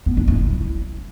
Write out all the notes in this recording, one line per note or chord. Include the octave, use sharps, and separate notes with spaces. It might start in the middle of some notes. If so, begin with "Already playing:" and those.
B3
D4
E4